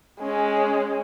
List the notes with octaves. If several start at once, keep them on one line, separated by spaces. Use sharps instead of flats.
G#3 C#4